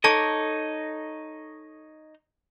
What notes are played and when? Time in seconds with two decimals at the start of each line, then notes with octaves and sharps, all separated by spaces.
0.04 D#4 A4 C#5 D#5 A5